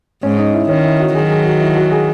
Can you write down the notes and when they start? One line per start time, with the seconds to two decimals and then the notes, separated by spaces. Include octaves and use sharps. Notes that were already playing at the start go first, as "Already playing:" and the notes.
0.23 G#2 C#4
0.38 D#4
0.54 E4
0.69 D#3 C#4
0.84 E4
1.00 F#4
1.15 D#3 F#3 G#4
1.30 G#4
1.45 F#4
1.60 E4
1.76 F#4
1.91 G#4